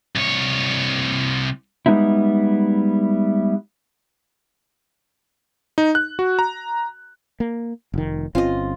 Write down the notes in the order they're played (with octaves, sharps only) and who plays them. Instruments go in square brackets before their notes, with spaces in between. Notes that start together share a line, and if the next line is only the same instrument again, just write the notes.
[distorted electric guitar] C2 C#5
[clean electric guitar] G3 G#3 B3 D#4 E4
[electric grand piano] D#4
F#6
F#4
A#5
[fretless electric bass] A#3
F1 D#3
[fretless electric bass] G1 C4 C#4 [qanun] F4 D#5